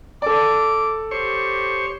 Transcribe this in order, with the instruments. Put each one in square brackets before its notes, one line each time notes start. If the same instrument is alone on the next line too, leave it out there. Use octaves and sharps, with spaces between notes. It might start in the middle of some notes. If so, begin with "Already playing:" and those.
[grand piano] A4 D5 [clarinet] D6
[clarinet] G4 [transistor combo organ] C5 C#5 C#6